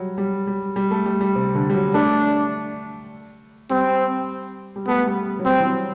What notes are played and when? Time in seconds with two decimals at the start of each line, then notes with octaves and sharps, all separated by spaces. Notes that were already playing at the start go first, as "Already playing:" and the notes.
Already playing: F#3 G3
0.18 G3
0.47 G3
0.76 G3
0.91 A3
1.06 G3
1.21 G3
1.35 C3
1.55 D3
1.70 G3
1.74 F#3
1.94 A3 D4
3.70 G3 C4
4.76 G3
4.87 A3 B3
5.07 G3
5.39 F#3
5.45 G3 C4
5.60 E3
5.66 F#3